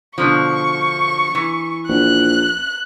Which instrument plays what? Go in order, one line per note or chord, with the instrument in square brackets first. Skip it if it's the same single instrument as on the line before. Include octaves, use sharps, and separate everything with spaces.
[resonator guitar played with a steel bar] B2 D3 F3 [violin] C#6
[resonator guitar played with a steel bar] E3
[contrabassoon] A#1 [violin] F#6